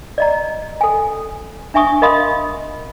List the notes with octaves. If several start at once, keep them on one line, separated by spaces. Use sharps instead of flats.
D5 D#5 A#5
A4 G#5
D4 E5 G#5 C#6 D#6
A#4 D#5 F5 B5 C6 D#6